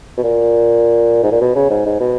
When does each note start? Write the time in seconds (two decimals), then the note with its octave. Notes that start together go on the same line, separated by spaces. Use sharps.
0.18 B2
0.23 A#2
1.23 G#2
1.32 A#2
1.41 B2
1.56 C#3
1.70 G#2
1.86 G#2
2.00 B2